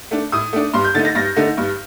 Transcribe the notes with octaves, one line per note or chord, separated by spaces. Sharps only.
A3 D4
A2 D#6
A3 D4
G2 C6
G6
D3 A3 D#4 A6
A#6
G2 A#6
D3 A3 D#4
G2